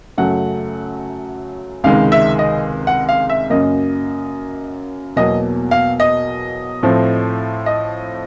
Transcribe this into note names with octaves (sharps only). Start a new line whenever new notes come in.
F#2 C#3 F#3 A3 F#5
C#2 C3 D#3 G#3 F5
E5
D#5
F#5
F5
E5
F#2 C#3 F#3 A#3 D#5
E2 B2 F#3 A#3 D#5
F5
D#5
A2 F3 A3 C4
D#5